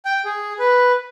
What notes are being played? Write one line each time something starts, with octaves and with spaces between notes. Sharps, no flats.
G5
G#4
B4